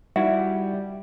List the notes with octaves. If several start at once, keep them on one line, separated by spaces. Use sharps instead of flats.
G3 D#4 E4 F#4 E5